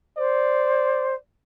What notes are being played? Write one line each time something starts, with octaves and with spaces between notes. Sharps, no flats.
C5 D5